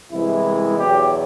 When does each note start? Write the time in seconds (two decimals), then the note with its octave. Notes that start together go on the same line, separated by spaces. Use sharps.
0.12 C2 C3 E3 G#3 B3 E4
0.78 E2 B2 F#3 G4